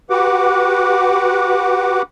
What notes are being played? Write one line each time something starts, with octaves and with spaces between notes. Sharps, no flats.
F#4 G4 B4 F#5 D6